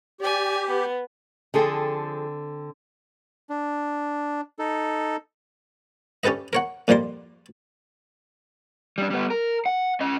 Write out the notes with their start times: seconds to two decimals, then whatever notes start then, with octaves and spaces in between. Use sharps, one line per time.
0.21 G4 D5 G#5
0.67 B3
1.54 D3 F3 C4 G#4 A4 G5
3.49 D4
4.59 D#4 A4
6.24 C#4 G4 A4 B4 D#5
6.53 A#4 C#5 F#5
6.88 F2 A#2 G3 A#4 C6
8.98 G3 D4
9.10 G3 B3
9.30 A#4
9.66 F#5
10.01 C#4 D#5